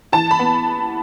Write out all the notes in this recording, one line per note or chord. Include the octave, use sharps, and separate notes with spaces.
E3 A5
B5
B3